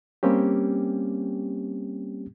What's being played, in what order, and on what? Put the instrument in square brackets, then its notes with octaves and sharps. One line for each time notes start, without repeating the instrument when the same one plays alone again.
[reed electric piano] G3 A#3 C4 C#4 G4